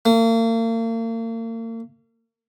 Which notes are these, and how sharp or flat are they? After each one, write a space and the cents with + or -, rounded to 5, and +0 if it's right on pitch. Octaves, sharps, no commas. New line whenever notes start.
A#3 -40